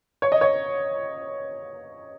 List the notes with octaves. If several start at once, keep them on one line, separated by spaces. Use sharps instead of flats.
C#5
D#5
C#5